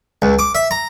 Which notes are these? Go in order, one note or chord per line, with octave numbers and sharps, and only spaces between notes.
C#2
D6
E5
A#5